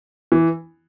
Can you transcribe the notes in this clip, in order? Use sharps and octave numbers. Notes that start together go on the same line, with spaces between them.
E3